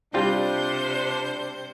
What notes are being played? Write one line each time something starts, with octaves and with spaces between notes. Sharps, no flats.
C3 G3 C4 D4 F4 C5 G6